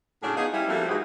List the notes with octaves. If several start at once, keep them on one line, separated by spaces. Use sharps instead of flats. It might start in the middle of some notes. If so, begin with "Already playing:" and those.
A2 C#3 F#3 D4 G#4
B3 D#4 F4 G#4
G3 C#4 E4
F3 G3 A3 A#3 C4 F#4
G#2 E3 F#3 D#4 F#4 G#4